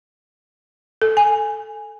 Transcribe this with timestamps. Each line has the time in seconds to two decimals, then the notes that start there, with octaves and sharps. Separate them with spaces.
1.02 A4
1.17 G#5